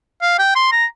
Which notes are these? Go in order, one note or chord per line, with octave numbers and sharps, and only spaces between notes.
F5
G5
C6
A#5